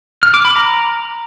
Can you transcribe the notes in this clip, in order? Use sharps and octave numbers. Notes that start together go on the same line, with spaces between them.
F6
D6
B5
A#5